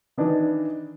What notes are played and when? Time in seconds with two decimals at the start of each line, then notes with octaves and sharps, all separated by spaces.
0.17 D#3 E3 D4 D#4